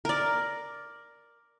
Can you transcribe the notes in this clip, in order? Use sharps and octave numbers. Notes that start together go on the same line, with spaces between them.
A#4 D5